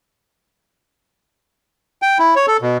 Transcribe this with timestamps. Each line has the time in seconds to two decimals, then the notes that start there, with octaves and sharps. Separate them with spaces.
2.02 G5
2.19 E4
2.36 C#5
2.47 A4
2.62 B2